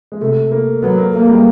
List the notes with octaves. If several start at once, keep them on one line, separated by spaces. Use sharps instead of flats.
G#3
C3 A3
A#3
F#3 B3
A#3
A3 A#3
G#3
G3